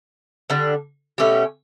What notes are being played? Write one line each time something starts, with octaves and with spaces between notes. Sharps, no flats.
D3 G3 D4
B2 A3 C#4 G4